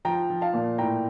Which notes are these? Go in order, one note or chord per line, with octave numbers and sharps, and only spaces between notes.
F3 G5 A#5
F3
F5 A5
A#2
A2 G5 A#5